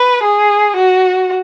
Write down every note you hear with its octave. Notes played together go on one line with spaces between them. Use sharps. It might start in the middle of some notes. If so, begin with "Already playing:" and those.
Already playing: B4
G#4
F#4